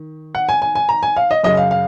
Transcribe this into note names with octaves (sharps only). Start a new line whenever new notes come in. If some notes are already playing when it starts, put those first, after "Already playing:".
Already playing: D#3
F#5
G#5
G#5
G#5
A#5
G#5
F5
D#5
F#2 C#3 D#5
F5
F5